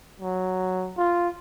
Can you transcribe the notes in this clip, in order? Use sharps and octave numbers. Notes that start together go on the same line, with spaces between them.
F#3
F4